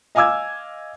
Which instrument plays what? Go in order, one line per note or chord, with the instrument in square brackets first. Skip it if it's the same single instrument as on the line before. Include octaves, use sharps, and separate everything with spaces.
[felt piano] D#5 F5 G#5 D6 E6 G#6